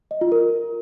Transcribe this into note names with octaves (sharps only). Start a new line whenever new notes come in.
D#5
F4
A#4